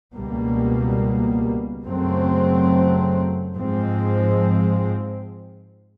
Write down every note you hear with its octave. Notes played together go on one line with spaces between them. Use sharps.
C#2 B2 G3 A#3
F#2 C#3 F#3 A3 C4
G#2 F3 G#3 C4